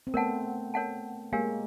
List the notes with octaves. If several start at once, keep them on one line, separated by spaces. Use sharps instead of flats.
C4
A3 B3 A#4 C#5 F#5 A5
A#4 C#5 F#5 A5
G#3 A#3 G4 A#4 C#5 F5 G#5